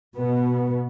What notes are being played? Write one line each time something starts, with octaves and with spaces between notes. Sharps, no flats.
B2 B3